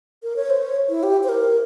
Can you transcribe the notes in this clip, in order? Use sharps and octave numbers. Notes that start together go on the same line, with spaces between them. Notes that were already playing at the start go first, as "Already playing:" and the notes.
A#4
C#5
C5
C#5
E4
G4
C5
A#4